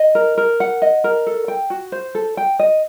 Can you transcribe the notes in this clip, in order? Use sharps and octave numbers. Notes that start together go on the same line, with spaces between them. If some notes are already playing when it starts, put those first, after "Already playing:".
Already playing: D#5
A#4
A#4
F#5
D#5
A#4
A4
G5
F#4
C5
A4
G5
D#5